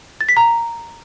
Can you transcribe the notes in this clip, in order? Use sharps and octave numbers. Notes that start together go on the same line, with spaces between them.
A6
B6
A#5